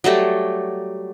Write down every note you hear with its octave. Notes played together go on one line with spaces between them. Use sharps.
F#3 G3 A3 G4